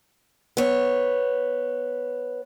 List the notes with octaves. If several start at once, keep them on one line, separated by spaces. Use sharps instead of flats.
B3 C#5